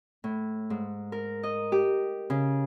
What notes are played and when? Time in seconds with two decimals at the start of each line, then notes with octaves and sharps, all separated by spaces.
0.24 A2
0.70 G#2
1.12 A#4
1.43 D#5
1.72 G4
2.30 C#3